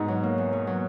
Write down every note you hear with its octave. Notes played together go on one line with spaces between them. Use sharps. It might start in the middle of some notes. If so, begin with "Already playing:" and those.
Already playing: G#2 B2
F#3
A#3
E2
B2
F#3